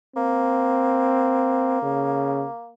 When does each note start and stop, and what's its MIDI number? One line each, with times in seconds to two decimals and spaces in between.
0.16 2.72 58
0.16 1.80 60
1.82 2.46 49